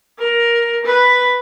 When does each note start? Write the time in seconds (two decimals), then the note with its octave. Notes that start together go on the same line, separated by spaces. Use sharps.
0.19 A#4
0.86 B4